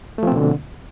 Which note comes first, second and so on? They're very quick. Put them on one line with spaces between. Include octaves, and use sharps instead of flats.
A3 F3 C4 B2 D3